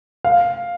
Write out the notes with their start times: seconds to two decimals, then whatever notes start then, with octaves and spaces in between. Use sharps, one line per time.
0.25 F5